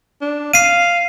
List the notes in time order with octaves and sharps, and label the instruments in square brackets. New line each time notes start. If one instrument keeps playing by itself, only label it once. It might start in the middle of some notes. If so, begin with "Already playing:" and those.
[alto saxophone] D4
[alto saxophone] F5 [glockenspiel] C7 D#7